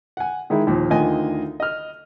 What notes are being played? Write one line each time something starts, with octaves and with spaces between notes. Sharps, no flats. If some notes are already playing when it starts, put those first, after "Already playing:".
F#5 G#5
D#3 G#3 D#4 E4
D#2 A#2 F3
D2 D#3 F4 D#5 G#5
D#5 F6